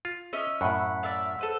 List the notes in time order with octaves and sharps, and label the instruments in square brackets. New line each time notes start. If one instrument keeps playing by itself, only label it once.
[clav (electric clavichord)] F4
[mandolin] C#4 D#5 E5
[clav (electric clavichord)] F#2 A2 [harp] F#5 B5 C#6
[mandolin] D5 E5 F5
A4 B4 C5